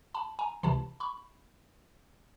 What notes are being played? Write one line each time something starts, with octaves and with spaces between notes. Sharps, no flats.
A5 B5
G#5 A#5
C#2 C3 E3 A5 B5
B5 C#6